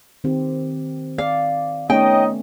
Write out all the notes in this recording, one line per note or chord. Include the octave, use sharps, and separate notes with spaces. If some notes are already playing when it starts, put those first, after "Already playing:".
D#3 C4 G4
D5 F5
A3 B3 C#4 D#4 C#5 D#5 G5